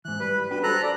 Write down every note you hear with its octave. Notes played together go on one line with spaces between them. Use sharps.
G#2 E3 F#6
G3 B4
D4 F#4 G4 B4
A4 C5 A#5 F#6
D5